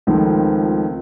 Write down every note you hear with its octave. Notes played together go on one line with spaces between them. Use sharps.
C#2 D#3 F3 A3 C4